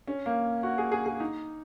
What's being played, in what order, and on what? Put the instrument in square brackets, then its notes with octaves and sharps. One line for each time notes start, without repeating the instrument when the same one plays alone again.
[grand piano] C#4
A#3
F#4
G#4
G#4
G#4
D#4